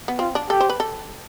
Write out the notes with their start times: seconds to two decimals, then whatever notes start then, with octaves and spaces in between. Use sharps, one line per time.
0.08 B3
0.19 C4 F4
0.35 D4
0.50 G4 A4
0.60 C5
0.70 B4
0.80 A4